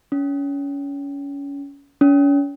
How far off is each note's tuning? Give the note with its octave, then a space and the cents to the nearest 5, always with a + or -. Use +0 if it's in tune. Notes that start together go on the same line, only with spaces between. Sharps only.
C#4 +25
C#4 +35